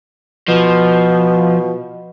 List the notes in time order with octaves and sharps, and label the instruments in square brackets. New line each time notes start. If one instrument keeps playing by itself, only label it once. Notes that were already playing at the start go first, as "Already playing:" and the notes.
[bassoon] B2 [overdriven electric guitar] F3